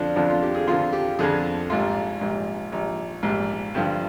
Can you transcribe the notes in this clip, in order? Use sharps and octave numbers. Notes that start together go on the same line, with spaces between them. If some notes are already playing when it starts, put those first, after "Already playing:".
Already playing: F2 D3 F3 D4
F2 D3 F3 D4
F4
G4
G#4
F2 D3 F3 F4
G4
F2 D3 F3 G#4
A#1 G#2 G3 F4
A#1 G#2 G3
A#1 G#2 G3
A#1 G#2 G3
G2 D3 F3